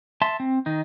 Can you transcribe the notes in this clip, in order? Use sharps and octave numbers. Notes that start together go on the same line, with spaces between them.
E5 A5 C6
C4
D#3 D#4